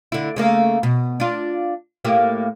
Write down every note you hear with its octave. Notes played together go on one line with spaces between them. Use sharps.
D3 E4
C#3 A3 A#3
B2
D4 F4
A2 A#3 G4